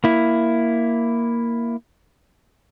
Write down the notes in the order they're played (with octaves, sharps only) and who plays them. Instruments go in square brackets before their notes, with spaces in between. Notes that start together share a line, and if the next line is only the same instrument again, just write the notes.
[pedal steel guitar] A#3 E4